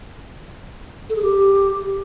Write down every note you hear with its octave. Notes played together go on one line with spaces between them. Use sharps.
A4
G#4
G4